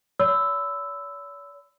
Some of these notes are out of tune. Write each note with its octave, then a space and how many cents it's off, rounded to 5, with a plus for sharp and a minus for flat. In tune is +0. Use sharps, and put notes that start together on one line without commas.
C#5 +45 B5 +35 E6 +0